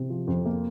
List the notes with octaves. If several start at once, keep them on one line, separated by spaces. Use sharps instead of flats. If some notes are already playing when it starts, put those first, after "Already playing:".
Already playing: C3
F3
F2
A#3